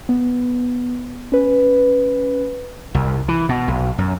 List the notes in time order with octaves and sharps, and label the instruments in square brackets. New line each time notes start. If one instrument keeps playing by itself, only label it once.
[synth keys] B3
C#4 B4
[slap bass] C2
E3
B2
B1
F#2